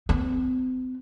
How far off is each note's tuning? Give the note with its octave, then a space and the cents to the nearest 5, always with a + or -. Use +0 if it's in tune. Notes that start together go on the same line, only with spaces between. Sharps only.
C4 -40